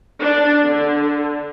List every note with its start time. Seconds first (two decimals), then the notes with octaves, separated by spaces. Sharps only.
0.21 D4
0.64 D3